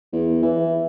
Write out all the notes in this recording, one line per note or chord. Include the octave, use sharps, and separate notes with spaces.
E2
E3